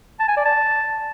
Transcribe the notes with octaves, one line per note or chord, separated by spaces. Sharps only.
A5
G#5
D5
A5